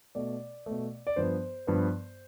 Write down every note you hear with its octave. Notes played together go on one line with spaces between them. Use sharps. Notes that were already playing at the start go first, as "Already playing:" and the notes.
B2 A3 D5
B2 A3
D5
G2 F3 B3 C5
G2 F3 B3